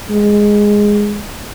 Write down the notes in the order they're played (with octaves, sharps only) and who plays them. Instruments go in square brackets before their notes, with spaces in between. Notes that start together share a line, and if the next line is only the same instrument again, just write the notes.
[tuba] G#3